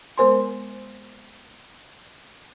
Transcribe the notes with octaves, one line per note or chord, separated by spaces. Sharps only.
G#3 B3 A#4 C5 G#5 C6